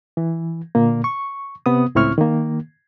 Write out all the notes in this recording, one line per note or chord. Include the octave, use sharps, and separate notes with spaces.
E3
A#2 D3 A#3
C#6
C3 B3 D#6
C#2 A2 C4 E4 C#6 F6
D#3 A#3